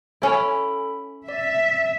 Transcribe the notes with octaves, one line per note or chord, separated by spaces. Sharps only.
C#4 E4 A4 B5
D5 E5